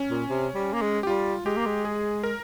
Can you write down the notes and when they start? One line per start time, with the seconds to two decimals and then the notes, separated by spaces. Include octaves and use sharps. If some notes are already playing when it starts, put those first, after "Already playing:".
Already playing: C#4
0.11 A#2
0.30 C3
0.55 G3
0.73 A#3
0.82 G#3
1.03 G4
1.07 G3 F4
1.45 G#3 G4
1.57 A#3
1.66 G#3
1.85 G#4
2.23 A#4